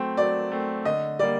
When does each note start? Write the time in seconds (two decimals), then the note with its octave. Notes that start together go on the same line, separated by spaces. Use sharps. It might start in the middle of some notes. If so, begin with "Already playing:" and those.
Already playing: F#3 A3 C4
0.17 F#3 D5
0.52 A3 C4
0.85 D3 D#5
1.19 G3 A#3 D5